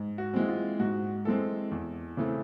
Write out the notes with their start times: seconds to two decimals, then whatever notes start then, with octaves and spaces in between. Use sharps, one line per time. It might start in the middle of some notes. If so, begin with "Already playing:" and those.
Already playing: G#2
0.18 F#4
0.34 E3 G#3 C4
0.49 F4
0.80 G#2 F#4
1.25 E3 G#3 C4 A4
1.71 E2
2.17 C#3 E3 A3 C4